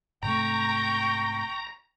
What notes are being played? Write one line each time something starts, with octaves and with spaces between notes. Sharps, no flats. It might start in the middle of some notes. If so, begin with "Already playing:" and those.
G#2 C3 A3 G5 A#5 C#6